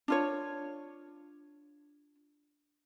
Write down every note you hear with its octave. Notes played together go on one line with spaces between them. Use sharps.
D4 F4 C#5